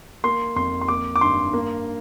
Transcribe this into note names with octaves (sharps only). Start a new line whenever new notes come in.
A#3 C6
F2 C6
C6
A#3 D6
D6
G2 C6
A#3